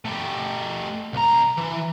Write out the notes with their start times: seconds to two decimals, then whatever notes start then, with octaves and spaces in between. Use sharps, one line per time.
0.05 A3 G4
1.13 C2 A#5
1.58 E3